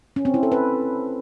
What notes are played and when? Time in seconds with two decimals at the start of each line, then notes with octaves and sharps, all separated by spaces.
0.16 C#4
0.25 C4
0.34 E4
0.43 A4
0.52 B4